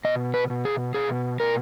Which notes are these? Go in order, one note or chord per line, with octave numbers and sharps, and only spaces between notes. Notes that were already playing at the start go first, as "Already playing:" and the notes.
B2 D#5
B4
B2
G#4
B2 G#4
B2 A#4